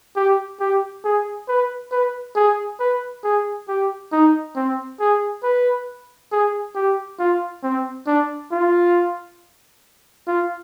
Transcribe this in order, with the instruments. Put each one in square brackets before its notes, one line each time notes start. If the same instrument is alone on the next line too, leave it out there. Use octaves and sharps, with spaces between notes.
[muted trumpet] G4
G4
G#4
B4
B4
G#4
B4
G#4
G4
D#4
C4
G#4
B4
G#4
G4
F4
C4
D4
F4
F4